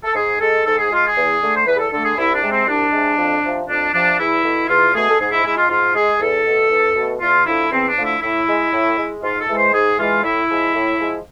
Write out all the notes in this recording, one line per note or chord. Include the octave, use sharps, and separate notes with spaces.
A4
G#2 G#4
G#3 A4
G#2 A4
G#4
G#3 F4
G#4
E2
D3 A3
C5
E2 B4
G#4
A4
D3 A3 A4
G#4
C2 E4
D4
C3 G#3
C4
C2 D4
C3 G#3
F2
C3 F3
F2 D4
C3 F3 D4
E2 E4
B2 A3
E2 F4
B2 A3 G#4
A4
G#2 G#4
E4
G#3 E4
F4
G#2 F4
G#3 G#4
E2 A4
B2 A3
E2
B2 A3
E2 F4
D3 F3 A3 E4
E2 C4
D4
D3 F3 A3
E4
A2 E4
G#3
A2
G#3
G#2 F4
A4
E3 G#3
C5
G#2 G#4
E3 G#3 F4
A2 E4
F3 G#3
A2
F3 G#3